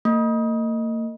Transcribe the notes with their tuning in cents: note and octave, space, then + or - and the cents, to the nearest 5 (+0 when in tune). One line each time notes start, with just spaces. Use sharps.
A#3 -40